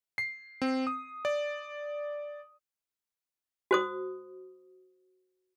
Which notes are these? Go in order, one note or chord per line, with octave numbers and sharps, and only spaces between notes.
C7
C4
D#6
D5
F#4 C5 D#6